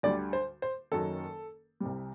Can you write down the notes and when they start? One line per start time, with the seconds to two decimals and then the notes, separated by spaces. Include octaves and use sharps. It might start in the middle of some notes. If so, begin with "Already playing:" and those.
0.03 D2 D3 G3 D5
0.33 C5
0.62 C5
0.92 F#1 F#2 D#3 F#3 A4
1.80 C2 C3 G3